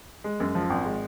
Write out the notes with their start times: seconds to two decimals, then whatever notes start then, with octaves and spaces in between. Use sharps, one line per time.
0.24 G#3
0.40 F#2
0.55 F3
0.70 G#1
0.85 G#3